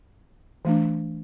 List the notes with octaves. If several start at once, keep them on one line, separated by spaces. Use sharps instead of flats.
E3 A3 D4